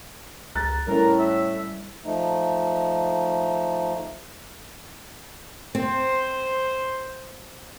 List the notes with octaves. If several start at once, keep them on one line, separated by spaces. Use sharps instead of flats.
C#2 A#5 F#6 A6
A2 G3 C#4 E4 A#4
E5
F3 A3 D#4
C4 C5